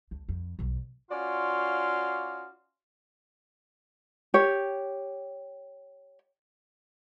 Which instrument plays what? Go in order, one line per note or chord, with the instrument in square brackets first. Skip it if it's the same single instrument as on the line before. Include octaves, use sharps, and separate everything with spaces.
[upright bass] D2
F2
B1 E2
[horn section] C#4 F4 F#4 D5 F5 C6
[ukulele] G4 C#5